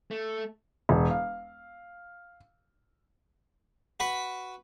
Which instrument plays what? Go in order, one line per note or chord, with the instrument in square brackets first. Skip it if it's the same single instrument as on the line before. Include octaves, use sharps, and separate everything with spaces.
[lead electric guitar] A3
[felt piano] E1
F5
[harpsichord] F#4 B4 B5